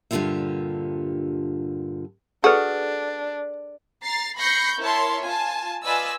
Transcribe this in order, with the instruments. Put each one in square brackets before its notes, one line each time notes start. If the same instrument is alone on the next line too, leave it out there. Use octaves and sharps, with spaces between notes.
[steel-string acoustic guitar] G2 A#2 D3 F4 G4 E5
[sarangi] D4 [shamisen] F#4 [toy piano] G#4 A4 B4
[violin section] A#5 A6 C7
B5 C#6 G6 A#6 C7 C#7
E4 A#4 C#5 E5 A5 C6
F4 G#5 A5
F4 B4 D5 D#5 G#5 E6